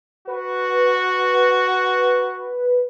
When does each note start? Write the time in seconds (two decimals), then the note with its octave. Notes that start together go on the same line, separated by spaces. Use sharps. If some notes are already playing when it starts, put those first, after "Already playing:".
0.27 F#4 B4